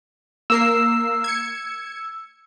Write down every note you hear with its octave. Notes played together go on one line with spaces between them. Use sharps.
A#3 A#4 E6 C7
G#6 C#7